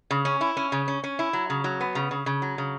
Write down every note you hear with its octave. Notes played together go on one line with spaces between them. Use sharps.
C#3
C#4
E4
C#4
C#3
C#4
C#4
E4
F#3
C#3
F#3
B3
C#3
C#3
C#3
F#3
C#3